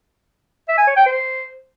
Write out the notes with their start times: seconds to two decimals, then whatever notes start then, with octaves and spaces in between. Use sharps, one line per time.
0.68 E5
0.78 G#5
0.87 C#5
0.96 G5
1.06 C5